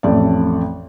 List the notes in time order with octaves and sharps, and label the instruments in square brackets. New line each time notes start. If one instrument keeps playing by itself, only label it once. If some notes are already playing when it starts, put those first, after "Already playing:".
[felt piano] A1 F2 A3 D5